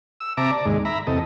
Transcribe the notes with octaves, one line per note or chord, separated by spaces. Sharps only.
E6
C3 E5 A5 A#5 D6
D5
D#2 G#2 G#3
E5 A#5 B5
E2 C3 A4 D#5